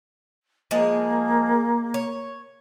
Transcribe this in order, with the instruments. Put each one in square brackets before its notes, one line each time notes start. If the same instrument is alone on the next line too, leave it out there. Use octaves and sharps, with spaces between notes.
[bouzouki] F3 G#3 G#4 [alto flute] A#3
[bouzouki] C#5